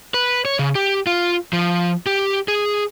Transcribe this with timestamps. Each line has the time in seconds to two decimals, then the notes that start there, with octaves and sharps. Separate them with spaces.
0.14 B4
0.45 C#5
0.59 C#3
0.75 G4
1.07 F4
1.53 F3
2.06 G4
2.48 G#4